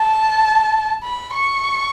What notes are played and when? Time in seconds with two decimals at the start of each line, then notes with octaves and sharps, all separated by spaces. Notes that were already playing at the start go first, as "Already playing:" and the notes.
Already playing: A5
1.03 B5
1.33 C#6